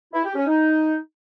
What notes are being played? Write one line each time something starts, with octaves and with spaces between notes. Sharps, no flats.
E4
G4
C#4
D#4